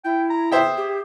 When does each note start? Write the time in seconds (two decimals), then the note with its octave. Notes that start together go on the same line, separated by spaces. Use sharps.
0.05 E4 G5
0.30 A#5
0.52 G#4 C5 E5 G5
0.77 G4